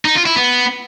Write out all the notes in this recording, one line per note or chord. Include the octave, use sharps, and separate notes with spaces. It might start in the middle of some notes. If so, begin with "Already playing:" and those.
D#4
F4
E4
B3